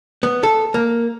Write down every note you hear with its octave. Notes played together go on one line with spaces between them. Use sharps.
B3
A4
A#3